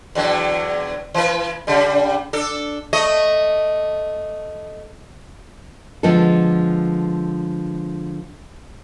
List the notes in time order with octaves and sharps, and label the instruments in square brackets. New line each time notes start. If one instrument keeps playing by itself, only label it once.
[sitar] E2 D3 F#3
E3 B4
C#3 G3
D4 A4
A3 D#5
[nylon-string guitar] D3 F3 G#3 B3 A4